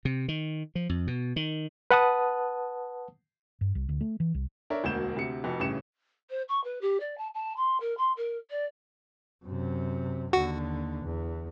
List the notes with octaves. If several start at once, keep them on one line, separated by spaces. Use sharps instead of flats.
C3
D#3
F3
F2
B2
D#3
B4 F#5 A5 D#6
G2
C2
D2
A3
E3
C2
D4 A#4 C#5 E5
E1 D2 B2 A#3 G6 E7
D2 C3 C#7
F1 F2 F#4
G1 A2 C#3 G4 C#7 E7
C5
C#6
B4
G4
D5
A5
A5
C6
A#4
C6
A#4
D5
F#2 C3
D#2 D3 F#4
E2